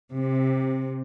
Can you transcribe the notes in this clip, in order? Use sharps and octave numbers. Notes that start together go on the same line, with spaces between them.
C3